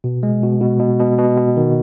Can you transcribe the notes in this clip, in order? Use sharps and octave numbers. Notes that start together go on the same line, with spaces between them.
B2
G#3
B2
B2
B2
B2
B2
B2
D#3